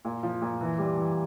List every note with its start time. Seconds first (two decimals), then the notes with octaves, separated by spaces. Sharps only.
0.05 A#2
0.23 F3
0.42 A#2
0.61 E3
0.78 G3
0.97 E3